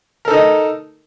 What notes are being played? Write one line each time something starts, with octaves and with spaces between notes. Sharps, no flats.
D#4 A4 A#4 D#5